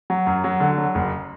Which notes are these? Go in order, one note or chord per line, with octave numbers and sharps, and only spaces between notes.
F#3
F#2
F#3
D3
F#3
F#1